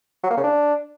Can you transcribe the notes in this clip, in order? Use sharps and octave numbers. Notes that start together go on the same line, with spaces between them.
F#3
A#3
C#3
D4